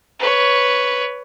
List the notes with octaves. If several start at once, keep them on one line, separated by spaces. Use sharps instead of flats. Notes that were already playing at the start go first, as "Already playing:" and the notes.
B4 C#5